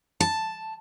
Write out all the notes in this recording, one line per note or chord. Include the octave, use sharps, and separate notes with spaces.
A5